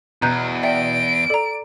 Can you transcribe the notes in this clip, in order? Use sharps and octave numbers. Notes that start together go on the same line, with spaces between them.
E2 B2 A#5 F#6 G6
D5 E5 G5 D7
A4 D5 A#5